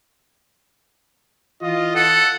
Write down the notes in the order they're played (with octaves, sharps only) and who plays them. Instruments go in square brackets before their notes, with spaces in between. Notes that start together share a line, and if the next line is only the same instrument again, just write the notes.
[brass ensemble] E3 F4 [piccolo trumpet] D#5
[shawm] A4 [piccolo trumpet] F#5